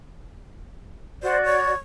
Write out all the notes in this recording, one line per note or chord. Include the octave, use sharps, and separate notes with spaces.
F#4 C5 D5
C#5